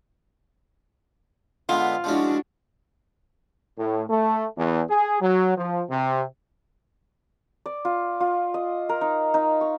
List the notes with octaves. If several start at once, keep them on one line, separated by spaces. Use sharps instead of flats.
D3 G#3 B3 F4
F3 G#3 C#4 D4 E4 F#4
A2
A3
E2
G#4
F#3
F3
C3
D5
F4
F4
D#5
A#4
D#4
D#4
C#6